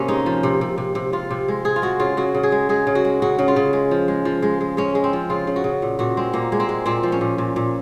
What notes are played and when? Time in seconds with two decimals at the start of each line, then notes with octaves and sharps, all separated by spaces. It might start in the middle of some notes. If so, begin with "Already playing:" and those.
Already playing: C3 A#3 C#4
0.08 G#3 D#4
0.26 F3
0.43 C3
0.61 C3
0.78 C3
0.95 C3
1.13 C3 F4
1.31 C3
1.48 G#3
1.65 G#3 G#4
1.76 F4
1.82 G#3 F#4
1.99 C#3 F4
2.17 C#3 F#4
2.34 C#3
2.43 G#4
2.52 G#3
2.69 G#3 G#4
2.87 C#3
2.95 F#4
3.05 G#3
3.22 C#3 F#4
3.39 C#3
3.48 F4
3.56 C#3
3.73 G#3
3.91 F3
4.08 G#3
4.25 F3
4.42 G#3
4.61 G#3
4.77 G#3 C#4
4.95 G#3
5.04 C4
5.13 F3
5.30 C#3 F4
5.47 C#3
5.56 F#4
5.64 C#3
5.82 A#2
5.99 A#2 F#4
6.17 G#3 C4
6.33 A#2 A#3
6.52 G#3
6.60 C4
6.69 G#3
6.86 A#2 C4
7.03 F3
7.12 C#4
7.21 A#2
7.38 A#2
7.56 A#2